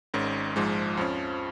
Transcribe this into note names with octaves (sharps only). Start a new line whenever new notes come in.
G#1 G#2 D#3 C#4
A#1 G#2 F3 G#3
F2 F3 C#4